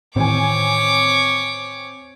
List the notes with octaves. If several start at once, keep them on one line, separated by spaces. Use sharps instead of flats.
A2 D#3 E3 C4 C#5 G#5 D6